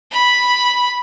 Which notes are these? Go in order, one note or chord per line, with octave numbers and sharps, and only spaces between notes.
B5